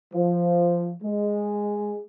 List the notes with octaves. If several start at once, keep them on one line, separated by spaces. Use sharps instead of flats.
F3
G#3